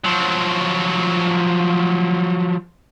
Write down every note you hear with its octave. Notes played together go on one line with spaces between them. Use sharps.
F3 F#3